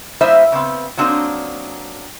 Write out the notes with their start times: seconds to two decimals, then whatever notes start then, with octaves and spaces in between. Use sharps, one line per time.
0.21 G3 A#3 E4 C5 D#5 E5
0.52 C#3 B3 C4
0.97 F#3 A#3 C4 D4 D#4